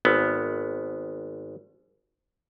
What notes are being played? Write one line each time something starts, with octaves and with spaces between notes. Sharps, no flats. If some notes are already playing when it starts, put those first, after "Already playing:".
G#1 B3